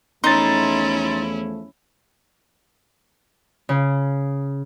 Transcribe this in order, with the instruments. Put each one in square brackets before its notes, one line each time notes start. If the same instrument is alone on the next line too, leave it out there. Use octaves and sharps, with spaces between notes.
[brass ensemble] E2 F3 A3 [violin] C#4 E4 [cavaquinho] D#4 [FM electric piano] C6 A6
[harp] C#3